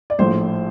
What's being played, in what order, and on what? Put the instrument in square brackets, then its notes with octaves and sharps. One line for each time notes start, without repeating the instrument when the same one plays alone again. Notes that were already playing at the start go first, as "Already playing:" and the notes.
[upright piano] D5
A#1 A2 F3 C5